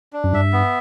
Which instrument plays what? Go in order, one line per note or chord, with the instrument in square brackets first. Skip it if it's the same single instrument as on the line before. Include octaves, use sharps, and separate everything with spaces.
[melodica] D4
[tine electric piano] F#2
[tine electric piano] G2 [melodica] E5
[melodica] B3